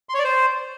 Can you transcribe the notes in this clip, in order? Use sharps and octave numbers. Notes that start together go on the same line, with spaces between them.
C6
C#5
D5
C5